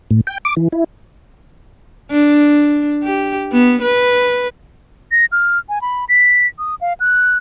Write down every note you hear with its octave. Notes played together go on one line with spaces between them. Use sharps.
A2
G5
D6
E3
E4
D4
G4
B3
B4
A#6
F6
G#5
B5
B6
D#6
F5
F#6